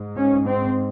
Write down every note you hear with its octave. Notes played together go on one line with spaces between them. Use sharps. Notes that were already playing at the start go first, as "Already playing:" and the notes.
Already playing: G#2
C#4
C4